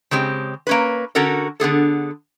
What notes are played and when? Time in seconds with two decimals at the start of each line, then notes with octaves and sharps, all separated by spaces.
0.11 C#3 G#3 C4 G4
0.67 A#3 C#4 B4
1.15 D3 C#4 F#4 A4 A#4
1.60 D3 B3 G#4 A4